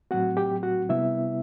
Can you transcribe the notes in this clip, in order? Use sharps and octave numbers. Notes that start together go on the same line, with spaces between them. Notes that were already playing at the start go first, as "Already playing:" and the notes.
A2 F#3 C4 F#4 F#5
G4 G5
F#4 F#5
C3 G3 B3 E4 E5